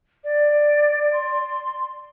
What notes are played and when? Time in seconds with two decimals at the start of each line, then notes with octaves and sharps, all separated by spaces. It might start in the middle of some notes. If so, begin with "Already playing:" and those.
0.24 D5
1.12 C6